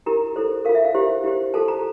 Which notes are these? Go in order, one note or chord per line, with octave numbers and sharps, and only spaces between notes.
E4 G4 A#4 A#5
E4 A4 C5
F4 A#4 F5
E5
F5
E4 G4 C5
E4 G4 C5
F4 A4 C5 A5
A#5